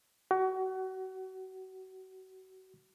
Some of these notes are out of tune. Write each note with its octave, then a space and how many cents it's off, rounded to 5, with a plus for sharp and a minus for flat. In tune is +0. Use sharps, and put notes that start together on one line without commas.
F#4 +30